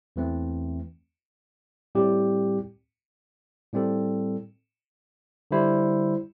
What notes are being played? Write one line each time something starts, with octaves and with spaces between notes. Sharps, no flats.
E2 E3 A3 C4
A2 G3 C4 G4
A2 G3 C4 A4
D3 G3 E4 C5